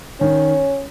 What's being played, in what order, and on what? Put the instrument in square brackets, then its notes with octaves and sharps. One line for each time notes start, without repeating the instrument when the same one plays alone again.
[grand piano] D#3 [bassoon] C#4